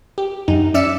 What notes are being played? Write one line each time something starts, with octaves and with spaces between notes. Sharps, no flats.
G4
F#2 D#4
C#4 D5 E5 E6 C#7